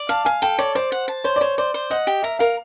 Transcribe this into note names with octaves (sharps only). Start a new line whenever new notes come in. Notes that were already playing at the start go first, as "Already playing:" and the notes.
Already playing: D5
F5 A5
F5 G#5
A4 G5
C#5 D5
C5 D5
F#5
A5
C5 C#5
D5
C5 C#5
C5 D5
C5
D#5 F#5
G4
A#4 E5
A#4 F5